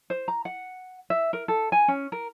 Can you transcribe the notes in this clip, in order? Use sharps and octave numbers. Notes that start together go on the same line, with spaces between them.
C5
A#5
F#5
E5
A#4
A4
G#5
C#4
A#4